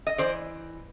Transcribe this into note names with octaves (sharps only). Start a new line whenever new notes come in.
D#5
E3 C5 D5